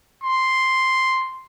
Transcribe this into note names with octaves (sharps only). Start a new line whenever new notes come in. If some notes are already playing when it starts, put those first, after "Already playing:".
C6